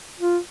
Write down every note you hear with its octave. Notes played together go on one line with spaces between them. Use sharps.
F4